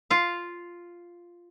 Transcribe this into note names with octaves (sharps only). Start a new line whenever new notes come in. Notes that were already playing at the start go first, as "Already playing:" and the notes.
F4 F5